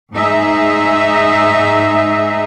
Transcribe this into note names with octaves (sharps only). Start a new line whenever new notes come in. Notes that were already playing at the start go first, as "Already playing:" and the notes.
G#2 D#4 G#4 E5